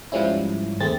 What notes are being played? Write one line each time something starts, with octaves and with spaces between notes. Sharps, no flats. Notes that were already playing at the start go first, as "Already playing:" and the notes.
G#2 F3 G3 C#4 E4
D#2 A3 C4 G#4 A6